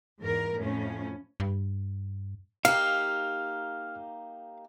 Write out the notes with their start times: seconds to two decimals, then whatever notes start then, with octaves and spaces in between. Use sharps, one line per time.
0.21 E2 G#2 A#4
0.59 F2 A2 C#4
1.40 G2
2.65 A#3 D#4 G4 F5 F6